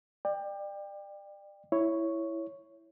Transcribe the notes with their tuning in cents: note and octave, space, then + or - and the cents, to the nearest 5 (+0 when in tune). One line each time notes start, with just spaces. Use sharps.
D5 +30 G5 +20
E4 +0 C#5 +0